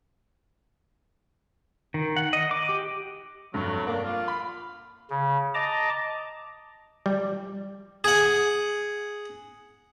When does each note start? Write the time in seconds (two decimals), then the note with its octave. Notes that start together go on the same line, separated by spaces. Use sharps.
1.94 D#3
2.16 F#5
2.33 D#5
2.51 D6
2.69 G4
3.54 F1 G2 F#3
3.87 A#3 D4
4.04 F4
4.28 B5
5.10 C#3
5.54 D#5 A5 A#5 D6
7.06 G3
8.04 G#4 F#5